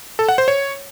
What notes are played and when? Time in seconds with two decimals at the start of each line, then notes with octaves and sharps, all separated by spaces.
0.19 A4
0.29 F#5
0.38 C5
0.48 C#5